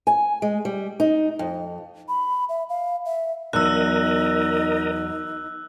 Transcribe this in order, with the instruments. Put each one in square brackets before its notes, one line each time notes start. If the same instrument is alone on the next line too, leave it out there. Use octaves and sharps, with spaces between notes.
[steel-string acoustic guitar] G#5
G#3
G3
D#4
F2
[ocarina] B5
E5
F5
E5
[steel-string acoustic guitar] E2 F#3 [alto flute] D#4 [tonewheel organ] A#4 D#5 [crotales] E6 F#6